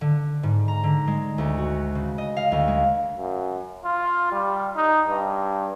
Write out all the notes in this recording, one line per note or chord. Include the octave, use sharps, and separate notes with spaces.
D3
G#2
A#5
D3
G#3
D2
F#4
C#3
D#5
F5
D2
G#3
F#2
F4
G3
D#4
G2